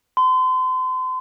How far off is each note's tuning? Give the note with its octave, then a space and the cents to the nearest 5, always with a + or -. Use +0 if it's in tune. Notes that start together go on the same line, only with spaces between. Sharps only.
C6 -35